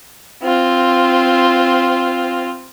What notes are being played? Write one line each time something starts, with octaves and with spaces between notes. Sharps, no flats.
C4 F4